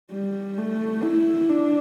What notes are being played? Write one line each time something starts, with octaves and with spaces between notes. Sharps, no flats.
G3
A3
E4
D4